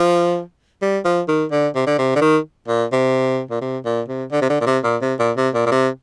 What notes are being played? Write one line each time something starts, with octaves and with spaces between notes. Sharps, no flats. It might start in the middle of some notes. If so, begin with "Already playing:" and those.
Already playing: F3
G3
F3
D#3
D3
C3
D3
C3
D3
D#3
A#2
C3
A#2
C3
A#2
C3
D3
C3
D3
A#2
C3
A#2
C3
A#2
C3
A#2
A#2
C3